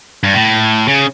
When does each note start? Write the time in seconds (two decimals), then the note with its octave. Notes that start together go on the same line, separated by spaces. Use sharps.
0.23 G2
0.35 A2
0.88 C#3